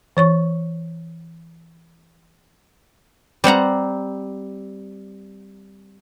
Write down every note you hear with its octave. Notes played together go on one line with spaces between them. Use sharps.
E3 C#5 C#6
G3 C4 F#5 A#5